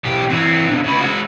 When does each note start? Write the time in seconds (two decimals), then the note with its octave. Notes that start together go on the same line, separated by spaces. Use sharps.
0.04 B1 G4
0.30 E3 C4
0.69 B2 D3
0.84 C#3 B4
1.01 G#3 F#4